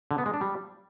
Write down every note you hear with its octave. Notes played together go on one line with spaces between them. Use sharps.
D3
B3
G#3
D4
G3